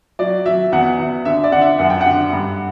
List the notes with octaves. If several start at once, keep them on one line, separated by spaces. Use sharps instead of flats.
F#3 D5
F#3 E5
E2 F#5
E2
D3 E5
D5
D3 F#5
E5
F#2 F#5
G5
F#5
D3
G2